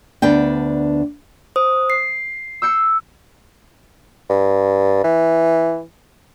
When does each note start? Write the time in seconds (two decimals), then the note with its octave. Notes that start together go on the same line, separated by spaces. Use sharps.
0.22 D2 B3 D4 G5
1.56 C5 D#6
1.90 C7
2.62 E6 G6 C#7
4.30 G2
5.04 E3